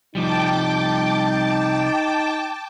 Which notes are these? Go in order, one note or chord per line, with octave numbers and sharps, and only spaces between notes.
C2 F3 G3 D#4 G5 A5 D6